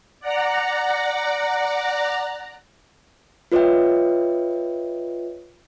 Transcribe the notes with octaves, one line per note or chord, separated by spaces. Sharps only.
D5 F#5 A#5
F4 B4 C#5 D#5 E5 G5